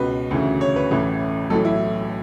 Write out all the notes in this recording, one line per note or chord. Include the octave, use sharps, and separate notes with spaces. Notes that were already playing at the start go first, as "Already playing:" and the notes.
Already playing: C#2 B2 B4
D2 C#3 E3
C#5
B4
A1 A2 E3
B1 A2 E3 A4
E4